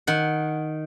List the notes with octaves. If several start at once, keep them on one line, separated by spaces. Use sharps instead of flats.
D#3 F#5